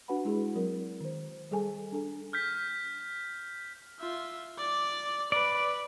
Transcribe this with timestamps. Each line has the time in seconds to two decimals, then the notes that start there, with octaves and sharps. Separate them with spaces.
0.08 D4 F#4 B4 F#5 A5 B5
0.25 G#3 E4 F#4 G#4
0.56 F#3 C4 A#4
1.01 D#3 C5
1.51 G3 G#4 A4 G#5 A5
1.92 D4 A4
2.33 F6 G6 B6
4.00 F4 E5
4.58 D5 D6
5.32 B4 D5